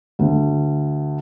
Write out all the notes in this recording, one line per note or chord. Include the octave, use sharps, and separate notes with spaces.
D2